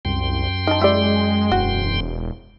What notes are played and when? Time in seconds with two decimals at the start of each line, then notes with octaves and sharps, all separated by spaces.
0.05 C2 F#2 G5 C6
0.67 D#3 D#4 A5
0.81 G#3 E4 G4 D5
1.52 E1 F#4